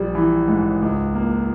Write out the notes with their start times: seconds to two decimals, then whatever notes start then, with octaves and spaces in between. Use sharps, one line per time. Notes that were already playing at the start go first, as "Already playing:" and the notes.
Already playing: A#1 G3
0.15 E3
0.48 G#2
0.82 C#2
1.15 A#3